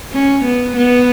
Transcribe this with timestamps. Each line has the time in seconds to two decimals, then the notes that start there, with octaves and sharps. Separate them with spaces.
0.12 C#4
0.45 B3
0.77 B3